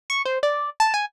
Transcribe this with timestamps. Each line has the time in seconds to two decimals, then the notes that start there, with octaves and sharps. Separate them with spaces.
0.10 C#6
0.25 C5
0.43 D5
0.80 A5
0.94 G#5